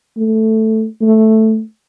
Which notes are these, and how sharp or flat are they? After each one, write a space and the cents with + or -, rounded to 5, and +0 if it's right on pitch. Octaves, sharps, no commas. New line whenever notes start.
A3 +0
A3 +0